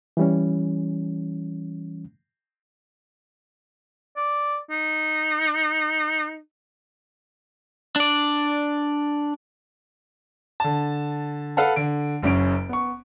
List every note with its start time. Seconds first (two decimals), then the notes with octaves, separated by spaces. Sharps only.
0.17 E3 G3 C#4
4.17 D5
4.70 D#4
7.96 D4 D5
10.60 D3 A5
11.57 A4 B4 F5 F#5 A5
11.76 D3 D7
12.23 F#1 F#2 C#4 D7
12.69 B3 C#6